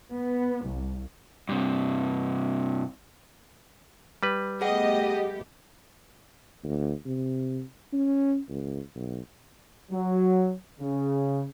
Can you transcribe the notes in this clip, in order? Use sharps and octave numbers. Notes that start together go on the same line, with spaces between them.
B3
C2
G2 C3
G3 B4
A3 B3 G4 G#4 D#5 F#5 G5
D2
C3
C#4
C#2
B1
F#3
C#3